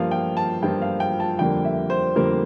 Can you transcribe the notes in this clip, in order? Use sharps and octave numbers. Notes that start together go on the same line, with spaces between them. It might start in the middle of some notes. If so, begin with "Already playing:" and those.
Already playing: G2 F3 A#3 F5
G5
A5
G2 F3 A#3 G5
F5
G5
A5
F2 D3 G3 A#3 G5
E5
C5
F2 D3 G3 A#3 A#4